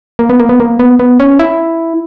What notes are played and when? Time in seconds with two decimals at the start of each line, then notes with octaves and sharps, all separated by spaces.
0.19 A#3
0.30 B3
0.40 A#3
0.49 B3
0.60 A#3
0.79 B3
1.00 B3
1.20 C#4
1.39 E4